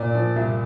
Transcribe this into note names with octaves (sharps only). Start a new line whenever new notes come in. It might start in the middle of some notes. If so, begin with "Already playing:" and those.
Already playing: A#2 D5
F3
C2